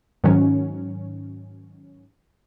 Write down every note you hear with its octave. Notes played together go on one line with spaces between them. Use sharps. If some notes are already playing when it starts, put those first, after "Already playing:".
G#2 D#3 F#3 C#4